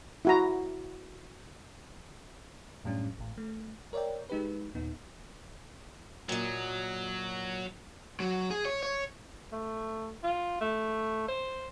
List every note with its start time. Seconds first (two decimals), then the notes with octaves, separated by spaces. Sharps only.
0.25 E4 F#4 A#5
2.84 F#2 A2 G3 C#4 D4
3.18 A1 A2
3.38 A3
3.93 A#4 C#5 D5 E5 G5
4.30 G#3 D#4 G4 B4
4.75 D#2 A#2 B3 D#4
6.29 A#2 F#3 D#5
8.20 F#3
8.50 G#4
8.65 C#5
8.83 C#5
9.52 A3
10.23 F4
10.61 A3
11.28 C5